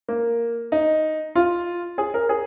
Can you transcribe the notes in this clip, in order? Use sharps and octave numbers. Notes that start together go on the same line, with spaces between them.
A#3
D#4
F4
G#4
A#4
G#4